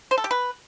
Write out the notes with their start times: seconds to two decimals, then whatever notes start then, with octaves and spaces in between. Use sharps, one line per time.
0.11 C5
0.18 A4
0.24 G4
0.31 B4